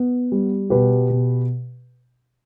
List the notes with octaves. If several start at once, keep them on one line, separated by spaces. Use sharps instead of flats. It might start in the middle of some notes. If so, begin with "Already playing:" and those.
Already playing: B3
G3
B2 G4 B4
B2